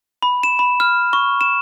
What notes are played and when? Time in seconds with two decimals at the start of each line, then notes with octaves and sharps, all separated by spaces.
0.22 B5
0.43 E7
0.59 B5
0.80 F6
1.13 C#6
1.41 E7